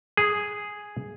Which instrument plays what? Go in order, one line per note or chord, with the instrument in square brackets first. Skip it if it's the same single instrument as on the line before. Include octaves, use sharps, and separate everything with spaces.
[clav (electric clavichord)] G#4